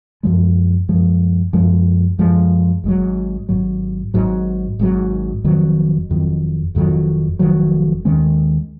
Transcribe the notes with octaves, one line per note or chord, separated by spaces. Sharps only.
F#2 F3 G#3
F#2 F3 G#3
F#2 F3 G#3
F#2 F3 G#3
G#1 G#2 F#3
G#1 G#2 F#3
G#1 G#2 F#3
G#1 G#2 F#3
F1 F2 D#3 F#3
F1 F2 D#3 F#3
F1 F2 D#3 F#3
F1 F2 D#3 F#3
D#2 D#3 G#3 C#4